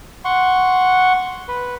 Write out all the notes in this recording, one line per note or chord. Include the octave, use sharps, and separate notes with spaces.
F#5 C6 C#6
B4